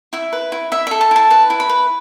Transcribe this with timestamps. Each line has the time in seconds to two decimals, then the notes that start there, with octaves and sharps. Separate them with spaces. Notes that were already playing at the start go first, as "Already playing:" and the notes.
0.13 E4 E5
0.33 B4
0.52 E4
0.72 E4 E5
0.87 A4 E5
1.01 A5
1.11 E4 A5
1.30 B4 A5
1.50 E4
1.60 B5
1.69 B4